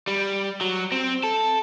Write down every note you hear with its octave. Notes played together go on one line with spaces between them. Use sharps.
G3
F#3
C4
A4